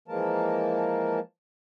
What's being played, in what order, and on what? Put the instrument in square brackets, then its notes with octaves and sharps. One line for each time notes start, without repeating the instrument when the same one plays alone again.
[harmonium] E3 F3 G#3 A#3 A#4 A5